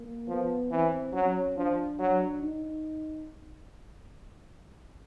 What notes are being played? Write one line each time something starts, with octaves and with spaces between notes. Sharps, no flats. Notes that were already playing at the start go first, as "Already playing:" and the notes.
Already playing: A#3
F3 B3
E3 C4
F#3 C#4
F3 D4
F#3
D#4